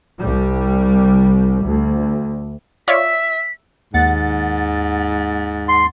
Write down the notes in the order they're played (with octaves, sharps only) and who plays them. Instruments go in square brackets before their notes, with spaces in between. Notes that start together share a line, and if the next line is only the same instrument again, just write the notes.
[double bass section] C2 G3
D2
[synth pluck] F4 C#5 D5 [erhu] E5 [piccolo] B6
[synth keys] D#2 F#5 A6 [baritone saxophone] G#2
[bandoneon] C6